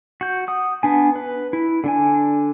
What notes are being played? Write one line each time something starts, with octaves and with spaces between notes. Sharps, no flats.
F#4 G6
F#5 D#6
B3 D4 G#5
B4
E4
D3 D4 G#5